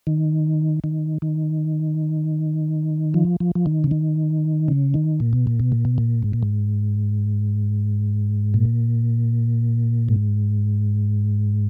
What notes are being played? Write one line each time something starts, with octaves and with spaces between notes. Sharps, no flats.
D#3
D#3
D#3
F3
F3
F3
D#3
C#3
D#3
C#3
D#3
A#2
B2
A#2
B2
A#2
B2
A#2
G#2
A#2
G#2
A#2
G#2